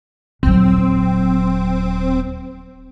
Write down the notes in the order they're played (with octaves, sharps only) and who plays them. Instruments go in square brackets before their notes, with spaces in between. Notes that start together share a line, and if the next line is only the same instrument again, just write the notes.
[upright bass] D#1 F#3 [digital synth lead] C4